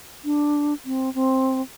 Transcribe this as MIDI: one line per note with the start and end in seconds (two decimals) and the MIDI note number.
0.24 0.73 62
0.85 1.13 60
1.14 1.61 60